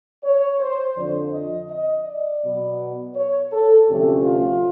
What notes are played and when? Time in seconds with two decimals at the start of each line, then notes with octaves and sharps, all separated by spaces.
0.24 C#5
0.59 C5
0.96 F2 D3 F3 D5
1.33 D#5
1.70 D#5
2.06 D5
2.43 B2 F#3 B3
3.15 C#5
3.53 A4
3.88 D2 C3 F3 A3 C#4 G4
4.25 F4